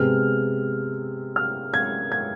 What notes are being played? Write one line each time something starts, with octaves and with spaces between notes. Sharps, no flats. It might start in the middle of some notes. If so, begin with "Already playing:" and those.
Already playing: C3 G#3 B3 F6
F6
G#6
G#6